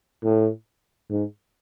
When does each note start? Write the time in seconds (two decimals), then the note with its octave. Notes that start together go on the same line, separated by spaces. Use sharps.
0.23 A2
1.10 G#2